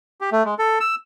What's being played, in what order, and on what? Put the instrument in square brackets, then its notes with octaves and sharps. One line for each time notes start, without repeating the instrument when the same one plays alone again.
[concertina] G4
A3
G#3
A4
E6